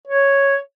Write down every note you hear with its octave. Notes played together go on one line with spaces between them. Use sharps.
C#5